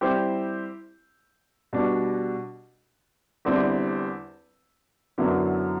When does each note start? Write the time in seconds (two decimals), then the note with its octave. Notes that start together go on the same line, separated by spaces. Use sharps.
0.01 G3 C4 E4 G4 C5
1.73 B2 G3 D4 F#4
3.45 E2 D3 G3 C4 E4
5.18 F#2 D3 F#3 B3 E4